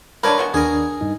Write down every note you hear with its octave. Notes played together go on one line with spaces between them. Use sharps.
D3 D4 A#4 B4 C#5
G#3 B3 F#4
D#2 D4 G#4 A#4 D#6
G2 D#4